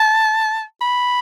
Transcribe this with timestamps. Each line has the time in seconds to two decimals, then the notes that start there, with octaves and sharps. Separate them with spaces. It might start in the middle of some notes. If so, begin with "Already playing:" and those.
Already playing: A5
0.81 B5